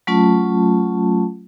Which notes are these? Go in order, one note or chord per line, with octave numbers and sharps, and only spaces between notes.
F#3 A3 C#4 F4 A5